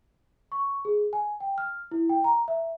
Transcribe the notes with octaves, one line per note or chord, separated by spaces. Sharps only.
C#6
G#4
G#5
G5
F6
E4
G5
A#5
E5